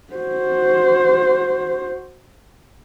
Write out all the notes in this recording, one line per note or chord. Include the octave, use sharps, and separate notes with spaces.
F#4 C5